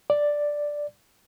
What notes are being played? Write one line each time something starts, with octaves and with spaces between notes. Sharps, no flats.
D5